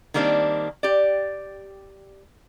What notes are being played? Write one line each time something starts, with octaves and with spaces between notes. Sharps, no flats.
D#3 G3 A#3 C4 D4
G4 D5